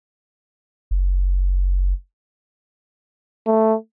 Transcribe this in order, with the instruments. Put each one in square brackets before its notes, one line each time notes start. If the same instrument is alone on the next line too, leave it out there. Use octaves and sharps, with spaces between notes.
[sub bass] F#1
[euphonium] A3